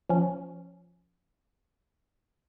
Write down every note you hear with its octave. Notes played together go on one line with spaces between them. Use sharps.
F3 C#4